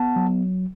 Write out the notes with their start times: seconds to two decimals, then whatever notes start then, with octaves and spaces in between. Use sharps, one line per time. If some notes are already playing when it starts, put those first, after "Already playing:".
Already playing: B3 F#5 A5
0.16 F#3